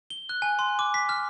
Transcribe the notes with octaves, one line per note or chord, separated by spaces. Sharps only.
G7
F#6
G#5
C6
D6
B6
F6